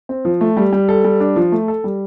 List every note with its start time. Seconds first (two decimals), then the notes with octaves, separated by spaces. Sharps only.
0.09 C4
0.25 F3
0.41 A3
0.57 G3
0.73 G3
0.89 A4
1.04 G3
1.20 D4
1.36 F3
1.52 A3
1.68 A4
1.84 G3